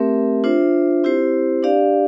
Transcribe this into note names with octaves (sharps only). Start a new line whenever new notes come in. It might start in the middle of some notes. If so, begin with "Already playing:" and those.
Already playing: A3 C4 G4 A#4 E5
D4 F4 C5 E5
C4 E4 G4 C5
D4 G4 D5 F5